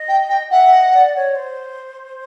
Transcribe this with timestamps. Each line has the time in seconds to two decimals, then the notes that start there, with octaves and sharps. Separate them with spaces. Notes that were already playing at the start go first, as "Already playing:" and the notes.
Already playing: D#5
0.09 G5
0.30 G5
0.50 E5 F#5
0.72 D#5
0.93 D5
1.15 C#5
1.35 C5